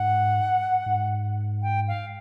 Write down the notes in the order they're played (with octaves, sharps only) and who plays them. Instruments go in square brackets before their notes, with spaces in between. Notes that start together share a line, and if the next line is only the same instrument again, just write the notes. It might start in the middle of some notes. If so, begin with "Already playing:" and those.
Already playing: [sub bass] G#2 [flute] F#5
[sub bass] G#2
[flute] G5
F5